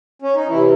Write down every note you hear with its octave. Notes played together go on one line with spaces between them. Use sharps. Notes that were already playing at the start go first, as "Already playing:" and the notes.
C#4
D#4
C3 E3 E4